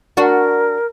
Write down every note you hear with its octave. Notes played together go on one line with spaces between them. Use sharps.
D4 F#4 A#4